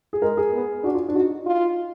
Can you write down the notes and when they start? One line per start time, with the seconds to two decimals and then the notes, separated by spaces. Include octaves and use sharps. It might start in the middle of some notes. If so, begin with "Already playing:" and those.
0.13 G#4
0.22 G#3 A#4
0.37 G#4
0.53 B3
0.83 D4 F#4
0.94 F4
1.09 D4
1.15 D#4 F#4
1.46 F4